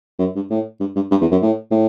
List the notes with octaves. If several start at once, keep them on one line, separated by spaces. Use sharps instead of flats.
F#2
G2
A2
G2
G2
G2
E2
F#2
A2
A2